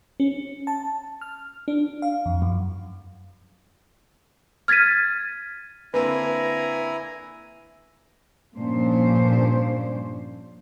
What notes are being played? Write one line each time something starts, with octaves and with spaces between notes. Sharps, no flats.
C#4
A5
F6
D4
F5
F2
F#2
F6 G#6 A6 B6 D#7
D3 A#3 C4 E4 B4 G#5 A#5
G2 A#2 F3 C#4 D4 C5